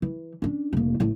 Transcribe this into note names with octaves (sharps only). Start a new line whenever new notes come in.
E3
C#4 D4
F1 A#3
A1 A2